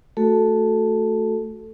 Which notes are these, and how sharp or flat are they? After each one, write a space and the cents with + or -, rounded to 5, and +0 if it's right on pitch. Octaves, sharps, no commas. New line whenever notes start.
A3 +0 F#4 +0 A4 +0